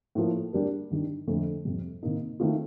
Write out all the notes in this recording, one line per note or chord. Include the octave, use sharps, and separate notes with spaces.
A2 F3 A#3
G3 D4 G4 A#4
G2 D#3 G3 D4
F2 D3 A3
F2 C3 G3
C3 D#3 A#3 D#4
D#3 A3 C4 F4